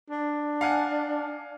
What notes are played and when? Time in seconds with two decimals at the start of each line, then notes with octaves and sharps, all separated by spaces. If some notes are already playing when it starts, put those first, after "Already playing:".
0.10 D4
0.61 F5 F#5 G#5